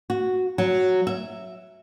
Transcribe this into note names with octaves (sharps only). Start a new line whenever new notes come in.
F#4
F#3
E5